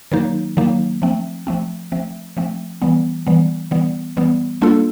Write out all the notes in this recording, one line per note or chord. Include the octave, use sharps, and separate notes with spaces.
D#3 F#3 A#3 D#4
D#3 F#3 A#3 D#4
F3 A3 C4
F3 A3 C4
F3 A3 C4
F3 A3 C4
E3 G3 B3
E3 G3 B3
E3 G3 B3
E3 G3 B3
G3 A#3 D4 F4 A4